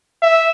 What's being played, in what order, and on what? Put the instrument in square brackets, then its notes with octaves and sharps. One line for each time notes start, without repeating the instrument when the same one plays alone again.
[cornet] E5